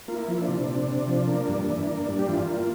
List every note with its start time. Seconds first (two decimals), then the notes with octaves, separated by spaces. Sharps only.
0.08 A#3 F4
0.15 E4
0.28 F3
0.41 D4
0.48 C3
0.68 C3
0.88 C3
1.08 F3
1.27 A#3
1.48 G2
1.68 E3
1.88 A#3
2.08 G2
2.19 G4
2.27 E3 F4
2.47 A#3